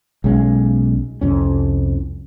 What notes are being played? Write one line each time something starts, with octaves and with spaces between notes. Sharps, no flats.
B1 G#3 C#4
C2 F2 C#4